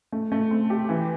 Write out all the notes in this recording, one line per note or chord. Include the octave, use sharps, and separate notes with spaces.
A3
A3
C4
G4
E3